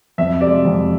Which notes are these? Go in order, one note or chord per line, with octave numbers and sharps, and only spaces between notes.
F2 E5
C3 G#3 D5
F2